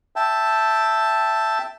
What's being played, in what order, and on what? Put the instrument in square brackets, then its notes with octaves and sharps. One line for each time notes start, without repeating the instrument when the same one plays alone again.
[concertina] E5 G5 A5